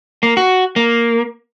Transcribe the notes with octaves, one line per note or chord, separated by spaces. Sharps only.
A#3
F#4
A#3